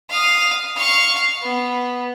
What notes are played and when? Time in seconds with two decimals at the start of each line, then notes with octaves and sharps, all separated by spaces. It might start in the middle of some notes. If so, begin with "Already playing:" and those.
0.10 F5 D#6
0.76 F5 C#6
1.42 B3